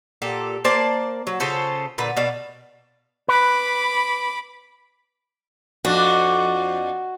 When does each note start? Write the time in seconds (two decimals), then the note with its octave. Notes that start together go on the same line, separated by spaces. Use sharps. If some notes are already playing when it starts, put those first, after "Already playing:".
0.22 A#2 G4 A4
0.65 A#3 C5 D5 A5
1.27 F#3
1.40 C#3 F4 A4 C5
1.98 A#2 D3 B4
2.17 B2 D4 F5
3.28 B4 B5 D6
5.85 F2 D4 F#4